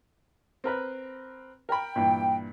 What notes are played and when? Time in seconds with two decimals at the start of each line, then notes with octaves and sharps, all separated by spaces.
0.64 C4 A#4 B4
1.69 A#4 G5 B5
1.96 G2 A#2 E3